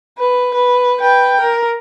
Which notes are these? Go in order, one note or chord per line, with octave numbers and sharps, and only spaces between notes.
B4
B4
B4 G5
A#4